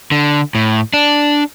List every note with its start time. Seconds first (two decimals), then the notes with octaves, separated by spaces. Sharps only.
0.12 D3
0.55 A2
0.94 D4